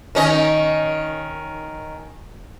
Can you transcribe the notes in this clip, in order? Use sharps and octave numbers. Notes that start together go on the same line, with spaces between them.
D#3 C#4 D#5